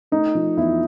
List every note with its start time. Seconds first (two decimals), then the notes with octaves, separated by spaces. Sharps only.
0.12 A3 D#4
0.35 F3
0.57 E2 E4